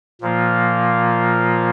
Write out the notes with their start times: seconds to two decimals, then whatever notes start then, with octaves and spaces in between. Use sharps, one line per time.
0.21 A#2 F3 A#3 F4